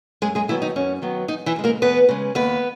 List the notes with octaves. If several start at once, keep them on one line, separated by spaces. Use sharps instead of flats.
F#2 G#3 G#4
G#3 G#4
D#3 E3 F#3 B3 E4
D#4
F#2 C#4
D#3 F#3 B3
E2 D#4
E3 E4
C#3 G#3
A#3 A#4
E2 B3 B4
C#3 G#3
D#2 B3 B4